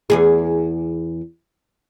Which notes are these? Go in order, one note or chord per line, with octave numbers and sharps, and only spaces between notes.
E2 G2 G#4